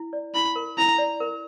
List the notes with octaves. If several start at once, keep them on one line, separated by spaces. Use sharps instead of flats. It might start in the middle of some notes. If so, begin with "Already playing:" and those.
Already playing: E4
D5
E4 B5
A#4
E4 A#5
D5
A#4